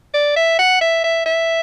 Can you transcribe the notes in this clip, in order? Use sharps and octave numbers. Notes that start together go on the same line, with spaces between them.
D5
E5
F#5
E5
E5
E5